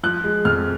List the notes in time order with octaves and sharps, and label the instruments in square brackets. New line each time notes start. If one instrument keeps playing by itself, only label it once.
[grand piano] F3 F#6
G#3
F2 F6